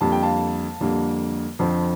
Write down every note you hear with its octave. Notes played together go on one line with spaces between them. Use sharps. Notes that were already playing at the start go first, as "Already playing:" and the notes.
F2 D3 G3 A#3 A5
G5
F5 A5
F2 D3 G3 A#3
F2 D3 F3 C4